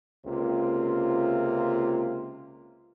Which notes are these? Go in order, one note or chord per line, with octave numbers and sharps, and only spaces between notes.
C#2 C3 A#3 F4